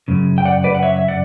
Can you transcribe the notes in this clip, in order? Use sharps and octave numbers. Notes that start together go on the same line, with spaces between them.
F#2 C#3
G5
D5 F#5
B4 D5
F#5
C#5 E5
E5
D5 F#5